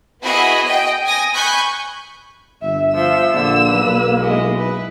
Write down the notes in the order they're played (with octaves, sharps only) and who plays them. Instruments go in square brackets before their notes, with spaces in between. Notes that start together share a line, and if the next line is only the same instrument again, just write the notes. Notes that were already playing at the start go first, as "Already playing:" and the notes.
[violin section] B3 E4 F#4 G#4 D#5 B5
D#5 G5
G5 G#5 D#6 A#6
G#5 B5 C#6 F#6 G6
[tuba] G1 [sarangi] E5
[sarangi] F3 [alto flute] E5 [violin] E6
[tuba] A#1 [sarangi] D3 [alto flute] A#3
[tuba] B1 [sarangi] B4
[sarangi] G#3 [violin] E4 D#5
[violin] E4 [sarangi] B4